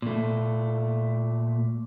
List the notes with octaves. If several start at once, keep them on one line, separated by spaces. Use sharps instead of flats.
A#2 A3